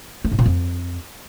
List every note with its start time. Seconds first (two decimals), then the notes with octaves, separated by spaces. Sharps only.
0.25 A3
0.32 A2
0.39 A#2
0.46 F2